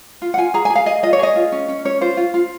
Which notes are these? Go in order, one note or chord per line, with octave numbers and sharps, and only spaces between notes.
F4
F#5
F4 G#5
G#4 A#5
G#4 G#5
F5
G#4 D#5
F4 D#5
C#5
G#4 D#5
F4
C#4
C#4
C#4 C#5
F4 C5
F4
F4